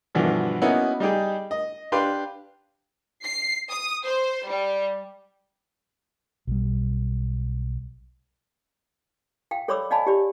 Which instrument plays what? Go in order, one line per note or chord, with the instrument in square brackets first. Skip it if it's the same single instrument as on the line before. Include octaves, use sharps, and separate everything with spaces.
[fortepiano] G2 B2 D3 E3 F3
A#3 B3 C#4 D#4 E4 F#4
G3 D#4 G4 G#4
D#5
D4 G4 B4 F5 C6
[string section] C7
D#6
C5
G3
[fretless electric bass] B1 G3
[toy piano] F5 G5
A4 C#5 D5 B5 D6 E6
D5 D#5 F5 G#5 A5 B5
G4 D5 B5